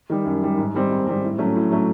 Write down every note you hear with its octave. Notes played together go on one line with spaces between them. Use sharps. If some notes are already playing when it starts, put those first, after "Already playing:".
D#3 G3
F#2
D#3 G3
G#2
D#3 G3 C4
G#2
D#3 G3 C4
A2
F#3 A3 C#4
A2
F#3 A3 C#4